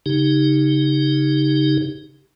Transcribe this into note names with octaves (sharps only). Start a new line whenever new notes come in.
C#3 D#4 G4